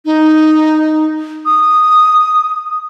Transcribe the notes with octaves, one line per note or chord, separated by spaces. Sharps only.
D#4
D#6